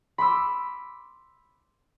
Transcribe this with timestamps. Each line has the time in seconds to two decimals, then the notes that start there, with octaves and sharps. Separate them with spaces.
0.18 B5 C6 D6 E6